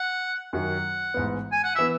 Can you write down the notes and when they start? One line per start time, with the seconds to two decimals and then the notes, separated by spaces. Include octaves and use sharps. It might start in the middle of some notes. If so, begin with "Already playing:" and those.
Already playing: F#5
0.53 F#2 D#3 F#3 F#5
1.14 A1 G#2 E3 B3
1.52 G#5
1.64 F#5
1.76 E3 B3 E5